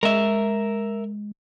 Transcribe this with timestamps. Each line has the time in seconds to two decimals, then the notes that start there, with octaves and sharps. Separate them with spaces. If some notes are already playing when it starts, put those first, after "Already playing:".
0.03 G#3 A#4 E5